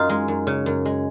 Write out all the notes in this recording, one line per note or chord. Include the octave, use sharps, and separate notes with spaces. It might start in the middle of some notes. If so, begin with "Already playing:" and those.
Already playing: F#2 D#4 F4
G#3
F#2
C#3
F#2
G#3